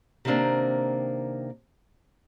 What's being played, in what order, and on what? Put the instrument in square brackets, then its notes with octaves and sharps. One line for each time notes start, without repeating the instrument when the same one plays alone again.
[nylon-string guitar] C3 D#3 G3 A#3 C4 D4